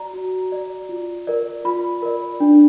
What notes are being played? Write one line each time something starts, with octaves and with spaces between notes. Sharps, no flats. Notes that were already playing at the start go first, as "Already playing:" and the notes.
Already playing: F#4 D5 A#5
F#4
D5
F4
A#4 D5
F4 B5
A#4 D5
D4